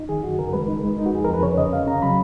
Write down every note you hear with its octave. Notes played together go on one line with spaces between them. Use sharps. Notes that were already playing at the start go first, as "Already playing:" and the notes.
Already playing: D#4
D#3 G#4
F#2 F#4
C#3 A#4
G#3 B4
D#4
G#3
D#4
F#4
F2 G#4
F2 A#4
B4
C#3 C#5
C#3 D#5
C#3 F5
C#3 A#5
F#3 B5